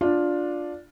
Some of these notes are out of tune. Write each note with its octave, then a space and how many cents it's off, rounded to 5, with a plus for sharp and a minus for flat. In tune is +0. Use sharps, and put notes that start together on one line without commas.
D4 +0 F4 +10